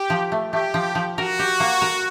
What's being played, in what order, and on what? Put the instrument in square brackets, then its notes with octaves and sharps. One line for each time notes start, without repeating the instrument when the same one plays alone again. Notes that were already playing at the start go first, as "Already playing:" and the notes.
Already playing: [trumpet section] G4
[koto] F3
A3
[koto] A3 [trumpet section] G4
[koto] F3
F3
[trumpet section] F#4 [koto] A#4
[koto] G4
A#3
A#4